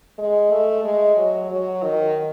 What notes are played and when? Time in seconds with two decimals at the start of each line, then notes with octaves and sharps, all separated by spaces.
0.19 G#3
0.52 A3
0.85 G#3
1.17 F#3
1.50 F#3
1.84 D#3